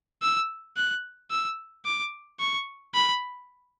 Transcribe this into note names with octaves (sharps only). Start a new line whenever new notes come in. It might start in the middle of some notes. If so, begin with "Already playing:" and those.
E6
F#6
E6
D6
C#6
B5